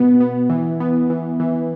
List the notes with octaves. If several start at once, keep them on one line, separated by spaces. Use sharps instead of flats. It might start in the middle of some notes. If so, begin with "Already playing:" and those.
Already playing: B2 B3
B3
E3
B3
E3
E3